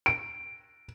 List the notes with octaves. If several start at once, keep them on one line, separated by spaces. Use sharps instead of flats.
D7